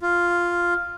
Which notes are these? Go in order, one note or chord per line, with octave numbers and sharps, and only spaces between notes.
F4